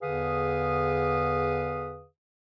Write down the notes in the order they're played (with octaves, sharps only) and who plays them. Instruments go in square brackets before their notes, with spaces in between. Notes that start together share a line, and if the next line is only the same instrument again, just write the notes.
[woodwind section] E2 D3 G#4 B4 F5 D#6